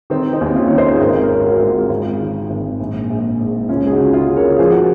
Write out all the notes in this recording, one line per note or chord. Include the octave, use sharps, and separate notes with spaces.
D#3 C4
C4 D#4
D#2
C#4 F4
D#3 C#5
C5 D#5
G#4
G#1 A#4
C5
A#4 C#5
F#2
F#4 A#4
G#1
F4 G#4
G#1
D#3
G#1
A#1
A#1
G#2
C#2 C#4 F4
G#4
D#4 F#4
C#3
F4 G#4
C#3
A#4 C#5
F3 G#4 C5
F#4